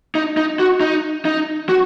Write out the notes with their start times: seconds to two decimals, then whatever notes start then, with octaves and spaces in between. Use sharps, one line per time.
0.15 D#4
0.37 D#4
0.59 F#4
0.80 D#4
1.25 D#4
1.69 F#4